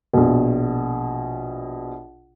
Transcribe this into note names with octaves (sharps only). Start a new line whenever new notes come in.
A#1 B2